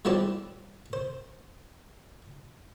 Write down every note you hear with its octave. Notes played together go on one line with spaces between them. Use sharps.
F#3 G3 E4 G4 C5 D5
C5